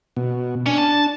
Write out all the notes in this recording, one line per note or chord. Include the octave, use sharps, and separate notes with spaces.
B2
C#4 D4
A5